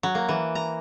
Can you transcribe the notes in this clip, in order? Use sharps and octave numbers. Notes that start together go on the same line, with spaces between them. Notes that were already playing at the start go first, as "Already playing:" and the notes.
F#3
A#3
E3
A#5